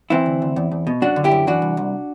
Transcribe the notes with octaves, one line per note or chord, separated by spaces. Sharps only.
E3 C4 E4
D2
D2
E2
E2
B2
F#2 D4 F#4
D3
E4 G4
F#2
E3 D4 F#4
C2
C2